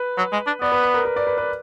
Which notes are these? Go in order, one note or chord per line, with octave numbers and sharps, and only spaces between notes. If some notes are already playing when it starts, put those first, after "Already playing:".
Already playing: B4
F#3
G#3
D4
B3 D5
B4
B4
A#4
B4
D5
B4
B4